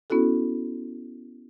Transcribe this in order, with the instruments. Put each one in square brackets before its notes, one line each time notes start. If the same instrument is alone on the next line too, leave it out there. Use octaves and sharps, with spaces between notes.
[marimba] B3 C#4 E4 F#4 A4